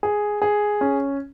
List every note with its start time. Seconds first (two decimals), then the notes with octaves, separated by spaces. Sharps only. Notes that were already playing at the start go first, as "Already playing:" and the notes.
0.03 G#4
0.42 G#4
0.81 C#4